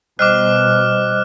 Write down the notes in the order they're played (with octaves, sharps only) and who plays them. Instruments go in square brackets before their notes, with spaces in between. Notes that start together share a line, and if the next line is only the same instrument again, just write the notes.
[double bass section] B2 [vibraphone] G3 C5 D#5 [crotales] D6 F6 F#6